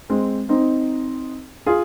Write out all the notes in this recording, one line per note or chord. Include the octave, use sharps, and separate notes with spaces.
G#3 C4
C4 D#4
F4 G#4